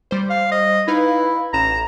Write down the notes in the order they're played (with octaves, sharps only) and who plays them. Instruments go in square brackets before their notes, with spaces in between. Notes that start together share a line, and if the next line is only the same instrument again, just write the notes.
[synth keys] G3 C5
[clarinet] F5
D#5
[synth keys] D#4 B4 F5 [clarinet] E4
[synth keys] A1 E7 [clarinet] A#5